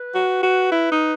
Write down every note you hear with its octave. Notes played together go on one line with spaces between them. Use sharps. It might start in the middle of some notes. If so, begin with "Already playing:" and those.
Already playing: B4
F#4
F#4
E4
D#4